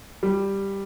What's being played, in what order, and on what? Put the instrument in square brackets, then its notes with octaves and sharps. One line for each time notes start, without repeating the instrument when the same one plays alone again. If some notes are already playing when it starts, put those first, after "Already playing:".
[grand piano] G3